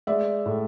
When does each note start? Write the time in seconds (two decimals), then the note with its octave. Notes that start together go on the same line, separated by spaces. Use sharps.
0.07 G#3 D5 E5
0.46 A2